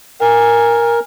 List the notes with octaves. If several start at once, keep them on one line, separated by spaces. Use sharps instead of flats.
A#4 G#5